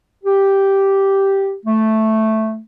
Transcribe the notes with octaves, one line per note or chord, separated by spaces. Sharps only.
G4
A3